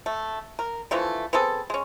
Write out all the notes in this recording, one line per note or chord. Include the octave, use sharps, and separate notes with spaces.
A3
A#4
D3 E3 F3 A3
B3 C4 G#4 A4
G#3 C#4